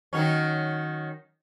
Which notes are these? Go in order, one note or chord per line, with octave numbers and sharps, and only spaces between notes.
D#3 F#3 C#4